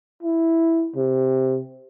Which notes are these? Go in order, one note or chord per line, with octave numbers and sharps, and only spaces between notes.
E4
C3